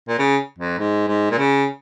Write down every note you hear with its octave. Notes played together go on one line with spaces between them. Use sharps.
A#2
C#3
F2
G#2
G#2
A#2
C#3